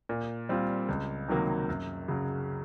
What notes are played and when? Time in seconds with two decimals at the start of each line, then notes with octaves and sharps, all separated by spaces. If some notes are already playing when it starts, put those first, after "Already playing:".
0.09 A#2
0.49 G3 C4 F4
0.89 C#2
1.28 C3 D#3 F#3 A#3
1.69 F#2
2.08 C#3 F#3